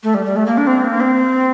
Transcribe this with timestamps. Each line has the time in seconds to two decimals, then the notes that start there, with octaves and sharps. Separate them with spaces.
0.03 A3
0.14 G3
0.25 G3
0.36 A3
0.46 A#3
0.58 D4
0.67 C4
0.84 A#3
1.00 C4